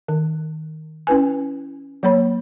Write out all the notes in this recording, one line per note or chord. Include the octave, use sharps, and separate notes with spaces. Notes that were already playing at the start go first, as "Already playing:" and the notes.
D#3
C#4 E4 B4 G#5
F#3 A#3 C#5 B5